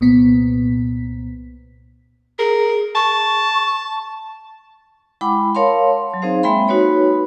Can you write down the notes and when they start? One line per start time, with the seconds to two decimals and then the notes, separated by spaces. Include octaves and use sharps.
0.01 C2 A#2 B3 B6
2.39 G#4 A#4
2.95 A5 C#6
5.21 G#3 E4 F#5 G5 B5 D6
5.55 A#4 C#5 F5 A5 C6
6.10 F#3 C6
6.22 C4 D#4 G#4 C5 F5
6.43 G#3 A#3 E5 G5 B5 C6
6.68 D#4 F#4 B4 C#5 B5